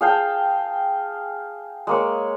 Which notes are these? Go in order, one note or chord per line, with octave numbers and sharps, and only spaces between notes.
G#4 F5 G5 A5
G#3 A#3 C#5